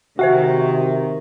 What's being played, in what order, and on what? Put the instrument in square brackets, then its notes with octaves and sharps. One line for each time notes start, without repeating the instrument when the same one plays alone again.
[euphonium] C3 [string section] D#3 [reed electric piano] F#4 [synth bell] C5 E5 C#6